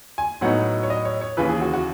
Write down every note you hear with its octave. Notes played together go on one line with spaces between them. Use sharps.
G#5
A2 F#3 B3 D#4 F#5
C#5
D#5
C#5
C#5
D#2 C#3 E3 B4
G#4
F#4
F#4